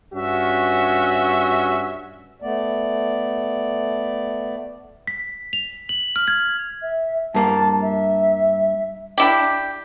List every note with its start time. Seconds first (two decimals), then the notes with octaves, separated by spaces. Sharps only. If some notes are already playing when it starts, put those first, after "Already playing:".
0.13 G2 C#4 F#4 E5
2.42 A3 B3 D5
5.07 B6
5.53 F7
5.89 F#7
6.16 F6
6.28 G#6
6.82 E5
7.34 G2 A#3 A5
7.82 E5
9.18 D4 E4 G4